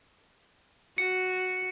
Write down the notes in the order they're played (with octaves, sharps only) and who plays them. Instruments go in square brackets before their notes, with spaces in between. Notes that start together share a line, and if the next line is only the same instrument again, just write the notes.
[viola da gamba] F#4 [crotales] C#7